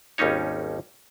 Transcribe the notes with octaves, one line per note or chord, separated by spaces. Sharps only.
G#1 D#2 G3 C#4 D#4 C#5